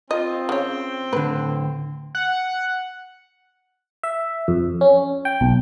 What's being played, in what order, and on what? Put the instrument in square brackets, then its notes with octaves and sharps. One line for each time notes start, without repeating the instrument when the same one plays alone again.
[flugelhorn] C4 [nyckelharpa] F4 [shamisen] D#5
[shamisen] C#3 C#5 [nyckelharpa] G5
[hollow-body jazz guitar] A2 D3 [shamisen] B4
[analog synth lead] F#5
[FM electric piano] E5
F2
C#4
G5
B1